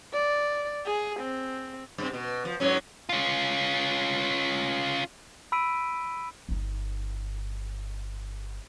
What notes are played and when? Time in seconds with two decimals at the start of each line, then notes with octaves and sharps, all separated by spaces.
0.13 D5
0.86 G#4
1.20 C4
1.98 G2 C4
2.13 B2
2.45 F3
2.60 G#2 F#3 C#4
3.09 C#4 F4
5.52 B5 E6 B6 D7 D#7
6.49 G1 D#4